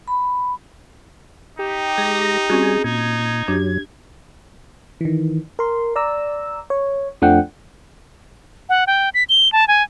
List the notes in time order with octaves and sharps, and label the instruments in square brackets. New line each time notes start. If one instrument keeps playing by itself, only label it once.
[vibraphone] B5
[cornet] D#4 [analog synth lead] G4
[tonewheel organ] G#3 A#6 [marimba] G#6
[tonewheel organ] G3 G#5 [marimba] C4 C#4 F#4 [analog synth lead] G#4
[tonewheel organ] A#2 [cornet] D#4 [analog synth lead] G#6
[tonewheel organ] F#2 F#3 [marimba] D4 G4
[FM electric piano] D#3 E3
A#4 C6
D5 A#5 E6
C#5
F2 F3 A3 D4 F#5 G5
[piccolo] F#5
G5
B6
G7
A5
G#5